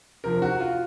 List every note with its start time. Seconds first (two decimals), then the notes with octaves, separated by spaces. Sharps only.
0.24 C3 F3 A#4
0.42 F#4
0.60 F4